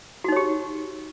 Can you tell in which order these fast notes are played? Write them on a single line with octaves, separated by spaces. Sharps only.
F#4 D#4 C#5 G4